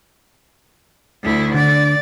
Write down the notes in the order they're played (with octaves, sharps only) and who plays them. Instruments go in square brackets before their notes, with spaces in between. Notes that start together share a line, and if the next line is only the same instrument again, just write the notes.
[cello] D2 E4
[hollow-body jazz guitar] D3 [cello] D5